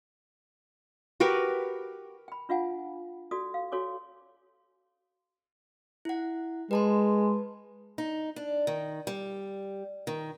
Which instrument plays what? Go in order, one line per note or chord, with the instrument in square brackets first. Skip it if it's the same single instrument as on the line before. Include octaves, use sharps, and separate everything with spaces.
[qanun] F#4 G4 A#4 B4
[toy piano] G5 B5
D4 F4 F5 F#5 G#5
F#4 A4 D5 D#6
F5
F#4 A4 C#5 G#5 D6
[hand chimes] E4 F#5
[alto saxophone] G#3 [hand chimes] B4 A5 C6
[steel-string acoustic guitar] D#4
D4
D#3
G3
D#3